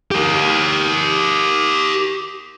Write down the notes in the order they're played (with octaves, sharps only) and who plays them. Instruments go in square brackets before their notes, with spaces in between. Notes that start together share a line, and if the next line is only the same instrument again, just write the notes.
[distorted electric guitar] G4 A#4